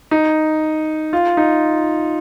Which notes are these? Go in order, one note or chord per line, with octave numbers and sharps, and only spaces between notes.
D#4
F4
D#4